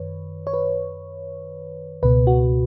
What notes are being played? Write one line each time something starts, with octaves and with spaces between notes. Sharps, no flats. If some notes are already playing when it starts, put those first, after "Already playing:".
Already playing: F#2 D#3 B4 C#5
C#5
B4
C#2 B2 B4
F#4